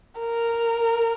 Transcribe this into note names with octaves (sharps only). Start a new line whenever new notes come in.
A#4